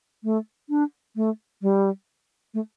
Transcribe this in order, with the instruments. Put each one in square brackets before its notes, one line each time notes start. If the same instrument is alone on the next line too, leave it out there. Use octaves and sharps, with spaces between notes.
[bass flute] A3
D4
A3
G3
A3